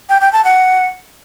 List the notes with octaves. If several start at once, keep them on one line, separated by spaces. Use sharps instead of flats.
G5
G5
A5
F#5